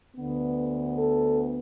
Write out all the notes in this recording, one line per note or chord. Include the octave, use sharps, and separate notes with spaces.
D2 D3 B3
A4